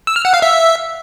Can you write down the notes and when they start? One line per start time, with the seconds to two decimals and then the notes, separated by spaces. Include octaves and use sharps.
0.07 E6
0.16 F6
0.25 F#5
0.34 F5
0.42 E5